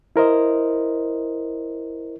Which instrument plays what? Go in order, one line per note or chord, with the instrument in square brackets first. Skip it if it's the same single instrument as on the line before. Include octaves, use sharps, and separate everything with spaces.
[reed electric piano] E4 A#4 C5 D#5